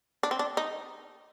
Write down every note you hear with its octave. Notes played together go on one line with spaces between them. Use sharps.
D4
C4
D4
D#4